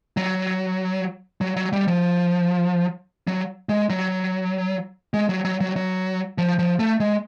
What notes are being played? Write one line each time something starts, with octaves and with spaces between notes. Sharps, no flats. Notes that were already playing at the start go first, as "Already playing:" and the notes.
F#3
F#3
F#3
G3
F3
F#3
G#3
F#3
G#3
F#3
F#3
F#3
F#3
F3
F3
A3
G#3